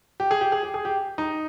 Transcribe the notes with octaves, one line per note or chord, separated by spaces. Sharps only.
G4
G#4
G4
G#4
G4
G#4
G4
D#4